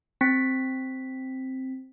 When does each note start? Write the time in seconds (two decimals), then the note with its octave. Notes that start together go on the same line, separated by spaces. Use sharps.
0.21 C4 B6